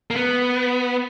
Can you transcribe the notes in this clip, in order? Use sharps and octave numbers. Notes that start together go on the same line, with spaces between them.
A#3
B3